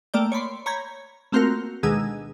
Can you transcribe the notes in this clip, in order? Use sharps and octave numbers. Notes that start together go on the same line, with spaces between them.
A3 A#3 D5 G5
C#5 D5 B5 C6
C#5 A#5 B5 G6 G#6
A3 A#3 C4 F4 F#4 A#4
D2 B2 D#3 G#3 G#4 E6